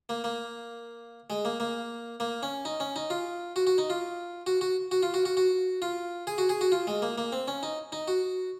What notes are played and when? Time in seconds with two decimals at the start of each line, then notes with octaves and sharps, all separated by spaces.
0.09 A#3
0.24 A#3
1.30 G#3
1.45 A#3
1.60 A#3
2.20 A#3
2.43 C#4
2.65 D#4
2.80 C#4
2.96 D#4
3.10 F4
3.56 F#4
3.67 F#4
3.78 D#4
3.90 F4
4.47 F#4
4.61 F#4
4.91 F#4
5.03 F4
5.14 F#4
5.25 F#4
5.37 F#4
5.82 F4
6.27 G#4
6.38 F#4
6.49 G#4
6.61 F#4
6.72 F4
6.87 G#3
7.02 A#3
7.18 A#3
7.32 C4
7.48 C#4
7.63 D#4
7.92 D#4
8.08 F#4